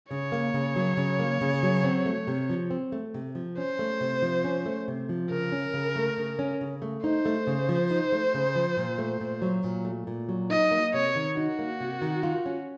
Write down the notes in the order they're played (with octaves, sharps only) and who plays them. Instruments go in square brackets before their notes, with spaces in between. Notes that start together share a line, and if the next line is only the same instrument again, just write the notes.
[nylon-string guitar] C#3 [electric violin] C#5
[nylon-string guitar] A#3
C#3
F#3
C#3
A#3
C#3
F#3
C4
A3
C3
F3
C4
A3
C3
F3
[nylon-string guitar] C#4 [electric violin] C5
[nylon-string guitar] A3
C3
F3
C#4
A3
C3
F3
[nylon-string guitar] C#3 [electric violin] A#4
[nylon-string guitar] C#4
C#3
A3
C#3
C#4
C#3
A3
[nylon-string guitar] D#4 [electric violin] C5
[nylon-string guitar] A3
C#3
F3
D#4
A3
C#3
F3
A#2
A3
A#2
F#3
A#2
A3
A#2
F#3
[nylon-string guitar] D#4 [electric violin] D#5
[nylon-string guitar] A#3
[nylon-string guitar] C3 [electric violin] C#5
[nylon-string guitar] D#3
[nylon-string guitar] D#4 [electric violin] F#4
[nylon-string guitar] A#3
C3
D#3
F4
C#4